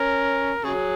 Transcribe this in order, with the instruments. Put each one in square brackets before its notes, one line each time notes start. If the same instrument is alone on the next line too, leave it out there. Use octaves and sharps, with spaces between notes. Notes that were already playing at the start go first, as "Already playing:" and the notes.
Already playing: [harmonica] C#4 [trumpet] A#4
[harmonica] C#3 F#3 [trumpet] G#4